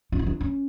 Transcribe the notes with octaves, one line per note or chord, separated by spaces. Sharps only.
C#4
E4
D4
C#4